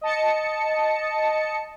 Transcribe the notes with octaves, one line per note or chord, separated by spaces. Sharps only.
D#5 A5 C#7